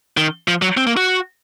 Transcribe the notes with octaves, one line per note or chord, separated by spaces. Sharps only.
D#3
F3
F#3
C4
A#3
F#4